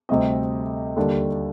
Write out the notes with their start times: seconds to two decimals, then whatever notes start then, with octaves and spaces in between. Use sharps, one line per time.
0.09 D2 C3 G3 C4 D#5
0.96 D#2 D3 G3 D4